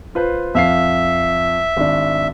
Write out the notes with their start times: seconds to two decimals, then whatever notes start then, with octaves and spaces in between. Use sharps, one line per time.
0.15 F4 B4 C5
0.55 F2 E5 F5 C7
1.77 G#1 D4